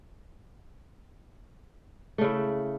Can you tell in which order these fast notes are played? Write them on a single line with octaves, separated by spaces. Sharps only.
A3 C#3 E4